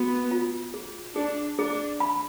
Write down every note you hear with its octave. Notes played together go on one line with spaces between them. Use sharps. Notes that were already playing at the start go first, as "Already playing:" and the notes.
Already playing: B3 F#4
F4
G#4
D4 G#4
D4 G#4
B5